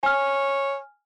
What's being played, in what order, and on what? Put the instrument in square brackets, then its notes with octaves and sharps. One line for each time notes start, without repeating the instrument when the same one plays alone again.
[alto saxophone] C#5 [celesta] G#5 F6